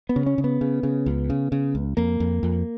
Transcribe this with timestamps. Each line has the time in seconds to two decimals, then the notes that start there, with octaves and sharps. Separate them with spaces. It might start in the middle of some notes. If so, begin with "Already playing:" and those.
0.09 B3
0.16 C#3
0.26 C#4
0.38 C#3
0.44 B3
0.61 C#3
0.83 C#3
1.06 C#2
1.30 C#3
1.52 C#3
1.75 C#2
1.97 F2 A#3
2.20 F2
2.43 F2